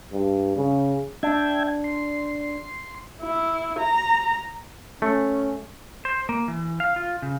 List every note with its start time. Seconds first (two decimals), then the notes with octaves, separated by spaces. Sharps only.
0.12 G2
0.57 C#3
1.23 D4 E5 G5 G#6
1.84 C6
3.22 E4
3.79 A#5
5.02 A3 C#4
6.05 C5
6.29 A#3
6.48 E3
6.80 F5
6.96 F4
7.22 C#3